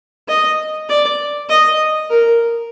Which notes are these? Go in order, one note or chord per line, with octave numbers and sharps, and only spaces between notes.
D#5
D5
D#5
A#4